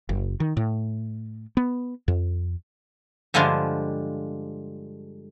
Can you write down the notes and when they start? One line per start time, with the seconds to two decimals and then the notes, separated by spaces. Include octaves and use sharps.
0.09 F#1
0.40 D#3
0.57 A2
1.57 B3
2.08 F2
3.34 G2 D3 F3 G#3 D4 F4